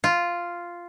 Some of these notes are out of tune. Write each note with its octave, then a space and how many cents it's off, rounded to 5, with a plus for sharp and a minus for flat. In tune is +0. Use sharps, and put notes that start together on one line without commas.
F4 -5